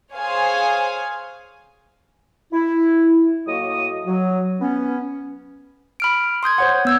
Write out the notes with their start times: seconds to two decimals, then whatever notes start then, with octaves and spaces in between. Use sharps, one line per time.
0.16 G#4 C5 C#5 F5 G#5
2.53 E4
3.47 A2 F#3 A#3 F#4 D#5 D#6
4.07 F#3
4.61 B3 C#4
6.00 B5 F6 D7
6.43 C6 D#6 G6 G#6
6.58 C5 C#5 F#5
6.85 B3 E6 G#6